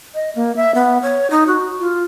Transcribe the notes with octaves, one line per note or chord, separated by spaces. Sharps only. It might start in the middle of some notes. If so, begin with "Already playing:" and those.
D#5
A#3
E5
B3
C#5
D#4
F#4
F4